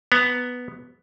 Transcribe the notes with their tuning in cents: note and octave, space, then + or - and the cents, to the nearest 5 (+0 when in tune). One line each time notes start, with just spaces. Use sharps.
B3 +0 A#5 +0